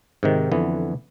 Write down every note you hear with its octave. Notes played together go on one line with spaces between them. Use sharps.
G#2 C3 D#3
F2 D3 E3 B3